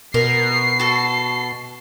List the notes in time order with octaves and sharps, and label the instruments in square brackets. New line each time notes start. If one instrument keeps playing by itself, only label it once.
[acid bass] B2 [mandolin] A#4 [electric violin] C7
[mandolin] F#4 A4